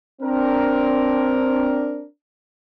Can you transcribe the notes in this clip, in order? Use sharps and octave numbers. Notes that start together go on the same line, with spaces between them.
C4 D4 A#4